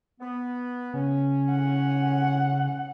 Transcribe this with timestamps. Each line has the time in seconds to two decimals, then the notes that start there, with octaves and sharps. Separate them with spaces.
0.20 B3
0.94 C#3 C#4
1.51 F#5